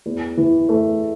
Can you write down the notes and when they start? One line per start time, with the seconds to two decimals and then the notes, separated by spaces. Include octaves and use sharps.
0.06 E2
0.37 E3
0.69 A3